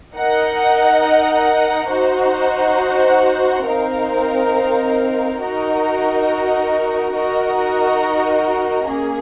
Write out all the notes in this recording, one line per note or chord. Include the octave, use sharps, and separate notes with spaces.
D#4 A#4 D#5 F#5
D#4 F#4 C5 F#5
C4 D#4 A#4 F5
D#4 F#4 A#4 D#5
D#4 F#4 A#4 D#5
A#3 C#4 G#4